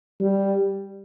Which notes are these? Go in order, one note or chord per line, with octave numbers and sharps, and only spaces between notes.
G3